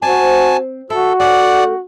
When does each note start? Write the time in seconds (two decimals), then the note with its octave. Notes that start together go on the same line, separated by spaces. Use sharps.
0.02 C4 F#4 D5 G#5 A5
0.90 E4 F#4 A4
1.20 A3 C#4 G#4 D5 F#5